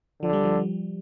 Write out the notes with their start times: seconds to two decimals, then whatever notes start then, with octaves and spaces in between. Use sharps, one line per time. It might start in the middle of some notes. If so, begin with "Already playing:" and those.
0.22 D3 F3
0.33 G3
0.44 F3